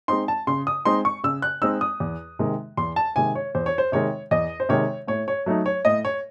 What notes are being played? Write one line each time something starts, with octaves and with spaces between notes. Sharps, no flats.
G#3 C4 D#4 C6
A5
C#3 C6
D#6
G#3 C4 D#4 C6
C#6
C#3 E6
F#6
G#3 C4 D#4 E6
D#6
E2
C3 D#3 G#3
E2 C6
A5
C3 D#3 G#3 G#5
C#5
E2 C5
C#5
C5
C3 D#3 G#3 C#5
E2 D#5
C5
C3 D#3 G#3 C#5
A2 C#5
C#5
F#3 A3 D#4
C#5
A2 D#5
C#5